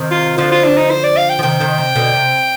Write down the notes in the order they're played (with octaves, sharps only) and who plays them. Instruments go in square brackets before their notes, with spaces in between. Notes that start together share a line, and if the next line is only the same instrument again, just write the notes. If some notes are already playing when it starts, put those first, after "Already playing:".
Already playing: [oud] C3 D#3
[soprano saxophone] F4
[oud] D3 F3 [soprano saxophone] F4
[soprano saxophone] F4
D4
D#4
C5
D5
F5
G5
[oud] F3
[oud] C3 D#3 [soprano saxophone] G5
[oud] C3 D#3
C3
B2 D3
C3